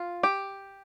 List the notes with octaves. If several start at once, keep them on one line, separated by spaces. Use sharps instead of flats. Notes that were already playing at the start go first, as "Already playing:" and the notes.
Already playing: F4
G4